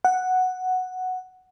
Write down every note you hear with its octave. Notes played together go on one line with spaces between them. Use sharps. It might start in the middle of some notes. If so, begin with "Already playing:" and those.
F#5